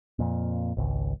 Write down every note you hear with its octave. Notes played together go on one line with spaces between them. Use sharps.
F2 A#2
G#1 C#2